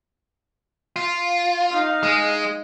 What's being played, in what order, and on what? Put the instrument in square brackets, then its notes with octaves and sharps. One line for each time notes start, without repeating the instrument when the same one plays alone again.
[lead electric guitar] F4
[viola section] D#4 F5
[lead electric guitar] G#3